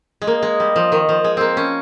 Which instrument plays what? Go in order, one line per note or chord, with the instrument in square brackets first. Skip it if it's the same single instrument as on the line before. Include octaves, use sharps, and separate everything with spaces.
[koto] G#3
[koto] A#3 [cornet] D#5
[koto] G#3
G3
F3
D#3
F3
G#3
A#3 C4
C#4